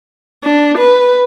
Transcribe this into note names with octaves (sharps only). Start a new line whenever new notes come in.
D4
B4